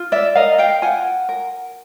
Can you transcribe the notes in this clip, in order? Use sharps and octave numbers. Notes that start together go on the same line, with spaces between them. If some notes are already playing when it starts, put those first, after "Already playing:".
Already playing: F4
D5 E5
A#4 D#5 F5
F5 G5
F4 F#5 G#5
A#4